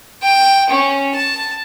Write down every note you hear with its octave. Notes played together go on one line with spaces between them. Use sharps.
G5
C#4
A5